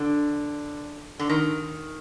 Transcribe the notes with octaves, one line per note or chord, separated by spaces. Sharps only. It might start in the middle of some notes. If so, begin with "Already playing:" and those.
Already playing: D3
D3
D#3